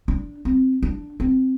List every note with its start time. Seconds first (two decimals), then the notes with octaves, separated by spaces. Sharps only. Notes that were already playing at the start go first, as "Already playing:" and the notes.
0.08 D4
0.45 C4
0.83 D4
1.20 C4